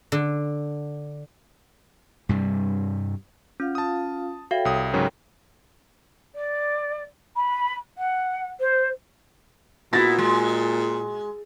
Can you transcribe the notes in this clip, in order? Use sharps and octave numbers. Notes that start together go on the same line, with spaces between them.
D3
G2 C3 G3
C#4 F4 F5
A5 D#6
F#4 A4 C#5 E5 F5 G5
C2 D#6
G#2 C#3 F#3 A#4
D5
B5
F#5
C5
A#2 B3 E4 F#4 A6 A#6
G#3